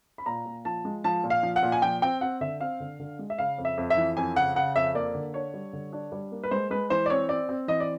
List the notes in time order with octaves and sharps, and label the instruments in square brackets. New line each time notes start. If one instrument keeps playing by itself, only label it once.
[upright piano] B5
A#2 A#5
A#2
F3 A5
G#3
F3 A5
A#2
F5
F3
F#5
A#2
G#5
F3 G5
C4 G5
C4 F#5
D3 E5
C4 F5
D3
D3
G#3
E5
C#3 F5
F2
E5
F2
E5
E3
F2 G#5
C#3 F#5
C#3 F#5
F2 E5
A#3 D5
D3
D4 C#5
G3
D3
D4
G3
A#3
B4
G#3 C5
G#3 B4
E3 C5
D5
C4 C#5
C4 D5
C4
E3 D#5
D5